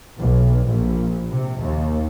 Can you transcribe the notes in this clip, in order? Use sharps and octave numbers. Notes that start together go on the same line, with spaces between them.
B1
A#1
C3
D#2